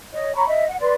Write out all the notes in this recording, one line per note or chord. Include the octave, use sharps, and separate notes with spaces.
C#5 D#5
C#5 A#5 B5 C#6
D#5 E5
F#5
B4 D5 C6